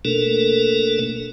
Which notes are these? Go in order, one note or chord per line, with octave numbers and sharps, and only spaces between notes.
B2 A3 A#3 D4 A4 A#4